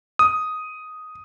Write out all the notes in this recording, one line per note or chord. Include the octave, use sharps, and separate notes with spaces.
D#6